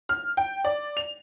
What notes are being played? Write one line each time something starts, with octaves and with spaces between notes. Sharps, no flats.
F6
G5
D5
F7